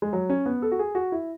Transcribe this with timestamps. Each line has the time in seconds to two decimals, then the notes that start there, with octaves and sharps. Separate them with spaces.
0.02 G#3
0.13 F#3
0.29 C#4
0.46 B3
0.62 A4
0.72 F#4
0.79 G#4
0.95 F#4
1.12 E4